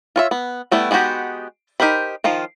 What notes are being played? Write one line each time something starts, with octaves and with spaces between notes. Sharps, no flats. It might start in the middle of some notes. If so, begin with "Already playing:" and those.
F4 C#5 E5
B3
G3 A3 B3 E4
G#3 B3 D#4 F#4 G4
D#4 G4 A#4 C5 B5
D#3 F3 F4